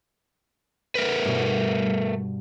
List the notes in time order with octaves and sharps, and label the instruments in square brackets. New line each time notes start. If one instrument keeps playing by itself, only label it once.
[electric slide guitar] A3 A#4 B4
[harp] G2 B2